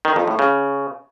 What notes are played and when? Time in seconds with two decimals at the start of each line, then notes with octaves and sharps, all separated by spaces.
0.05 D#3
0.16 F2
0.27 A2
0.39 C#3